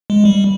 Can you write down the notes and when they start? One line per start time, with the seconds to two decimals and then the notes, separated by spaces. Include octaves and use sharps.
0.10 G#3
0.25 G3